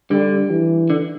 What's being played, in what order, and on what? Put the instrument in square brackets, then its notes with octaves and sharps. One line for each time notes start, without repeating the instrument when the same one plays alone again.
[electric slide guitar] D3 [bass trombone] G3
[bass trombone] E3
[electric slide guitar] D3